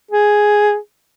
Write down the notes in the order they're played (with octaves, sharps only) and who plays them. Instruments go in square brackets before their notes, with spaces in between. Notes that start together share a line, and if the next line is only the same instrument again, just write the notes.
[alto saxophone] G#4